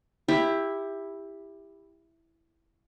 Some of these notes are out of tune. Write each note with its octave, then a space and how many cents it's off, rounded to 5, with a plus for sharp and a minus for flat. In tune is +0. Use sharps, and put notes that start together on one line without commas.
E4 +0 G4 +20